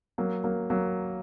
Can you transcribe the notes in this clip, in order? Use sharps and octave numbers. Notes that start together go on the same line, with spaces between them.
F#3 A#3
F#3 A#3
F#3 A#3